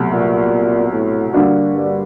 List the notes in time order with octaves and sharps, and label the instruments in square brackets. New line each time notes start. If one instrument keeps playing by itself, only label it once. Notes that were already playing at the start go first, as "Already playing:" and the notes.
Already playing: [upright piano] C2 B2 F#3 A3
[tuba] A#2
A2
[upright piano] D3 G3 A#3 D4 F#4
[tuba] G2